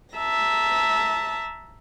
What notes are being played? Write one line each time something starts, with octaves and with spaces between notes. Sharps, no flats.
E5 A5 A#5